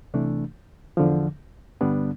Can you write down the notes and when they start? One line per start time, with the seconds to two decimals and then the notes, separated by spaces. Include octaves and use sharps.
0.14 C2 C3 E3 A3 D4
0.97 E2 D3 F3
1.81 G2 D3 G3 B3 D4